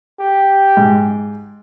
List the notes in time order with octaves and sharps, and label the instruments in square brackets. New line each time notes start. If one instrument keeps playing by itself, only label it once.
[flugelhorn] G4
[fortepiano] G#2